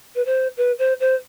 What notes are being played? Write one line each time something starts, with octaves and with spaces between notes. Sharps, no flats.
B4
C5
B4
C5
C5